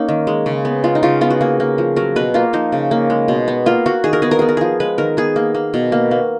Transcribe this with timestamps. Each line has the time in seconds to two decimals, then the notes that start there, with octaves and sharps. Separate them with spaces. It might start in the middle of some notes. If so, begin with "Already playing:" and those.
Already playing: A#3 C#4 D#4
0.09 D#3
0.27 G#3
0.46 C#3
0.65 B3
0.84 G#3 F4
0.95 D#4
1.03 C#3 F4
1.21 B3 F4
1.30 F#4
1.41 A#3 G#4
1.60 A#3
1.78 F3
1.96 F#3 A#4
2.16 B2 B4
2.34 A#3 F4
2.53 F3 D#4
2.72 C#3
2.91 A#3
3.10 G#3
3.28 B2
3.48 B3
3.66 A#3 F4
3.86 A#3 F#4
4.04 D#3 G#4
4.13 A#4
4.22 B3 G#4
4.31 A#4
4.39 B3 G#4
4.49 A#4
4.57 F3 G#4
4.80 G#3 B4
4.98 D#3 A#4
5.17 B3 G#4
5.36 A#3
5.55 A#3
5.74 B2
5.92 A#3
6.11 A#3